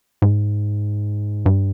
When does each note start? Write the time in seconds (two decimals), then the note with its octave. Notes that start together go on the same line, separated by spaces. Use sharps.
0.22 G#2
1.46 G2